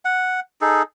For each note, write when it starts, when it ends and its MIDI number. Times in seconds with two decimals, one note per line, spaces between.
0.05 0.40 78
0.61 0.82 63
0.61 0.82 68
0.61 0.82 69